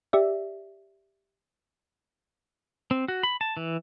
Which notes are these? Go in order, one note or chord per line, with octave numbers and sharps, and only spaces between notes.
G4 D5 E5
C4
F#4
B5
A5
E3